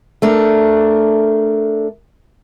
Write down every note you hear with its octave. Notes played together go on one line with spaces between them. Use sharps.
A3 D4 A#4